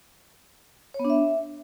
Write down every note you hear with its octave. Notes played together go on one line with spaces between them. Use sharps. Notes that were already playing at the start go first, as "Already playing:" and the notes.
C#5
B3
D4
E5